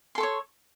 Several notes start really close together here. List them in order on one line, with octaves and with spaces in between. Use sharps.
C6 A4 C#6 C#5